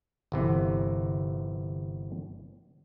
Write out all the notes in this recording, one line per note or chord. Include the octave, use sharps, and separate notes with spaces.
G1 C3 E3